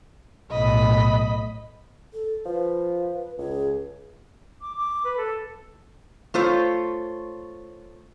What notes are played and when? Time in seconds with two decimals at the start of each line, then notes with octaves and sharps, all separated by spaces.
0.51 B1 A2 D#5 B5
2.13 A4
2.46 F3 B4
3.38 C#2 G#4
4.61 D6
4.77 D6
5.04 B4
5.17 A4
6.34 A3 F4 C5 C#5